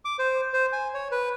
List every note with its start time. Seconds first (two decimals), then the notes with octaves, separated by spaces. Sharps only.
0.05 D6
0.19 C5
0.54 C5
0.73 G#5
0.94 C#5
1.11 B4